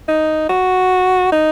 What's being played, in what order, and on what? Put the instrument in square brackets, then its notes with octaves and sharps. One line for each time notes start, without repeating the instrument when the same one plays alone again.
[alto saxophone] D#4
F#4
D#4